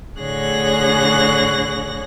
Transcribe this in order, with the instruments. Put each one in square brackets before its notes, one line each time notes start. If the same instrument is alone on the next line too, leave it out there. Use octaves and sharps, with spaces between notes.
[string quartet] A2 D3 G#4 C#5 F#6 A#6